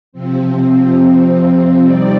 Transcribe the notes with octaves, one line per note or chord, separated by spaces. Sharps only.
C3 F3 C4
C3 G3 C4 D#4 D5